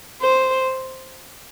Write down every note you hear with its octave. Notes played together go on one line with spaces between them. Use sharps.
C5